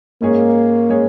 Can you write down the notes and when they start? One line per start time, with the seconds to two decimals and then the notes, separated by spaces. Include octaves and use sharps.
0.21 G#2 G#3 A#3 C#4 G#4 C#5
0.89 G#3 C#4 G#4 C#5